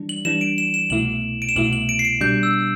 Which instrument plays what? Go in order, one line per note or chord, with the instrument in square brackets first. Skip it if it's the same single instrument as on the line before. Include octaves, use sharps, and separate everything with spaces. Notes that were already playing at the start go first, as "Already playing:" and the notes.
Already playing: [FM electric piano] E3 G3 D4
[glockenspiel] F#7
[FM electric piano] E3 G3 D4 [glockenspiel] E7
[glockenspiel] D7
E7
E7
[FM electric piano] C2 B2 A3 E4 [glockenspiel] F#7
[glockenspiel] D7
E7
[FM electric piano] C2 B2 A3 E4 [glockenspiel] F#7
[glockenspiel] F#7
D7
C7
D7
[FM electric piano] B2 G3 D4 [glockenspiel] G6
[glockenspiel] E6